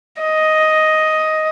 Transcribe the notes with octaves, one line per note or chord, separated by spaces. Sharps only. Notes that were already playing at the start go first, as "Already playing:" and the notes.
D#5